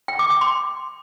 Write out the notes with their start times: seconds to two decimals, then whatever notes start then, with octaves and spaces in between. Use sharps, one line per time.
0.08 G5
0.19 D6
0.30 G5
0.41 C6